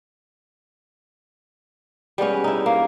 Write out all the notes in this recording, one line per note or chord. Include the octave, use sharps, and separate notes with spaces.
G3 G#3 B3 C#4
D#4 E4
A#3